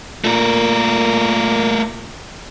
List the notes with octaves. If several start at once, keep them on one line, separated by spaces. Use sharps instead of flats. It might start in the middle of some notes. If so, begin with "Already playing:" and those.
A#2 A3 A#4